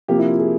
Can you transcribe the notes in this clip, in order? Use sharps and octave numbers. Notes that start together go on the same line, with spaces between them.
C3 F3 A#3 G4
E4
F4
G#4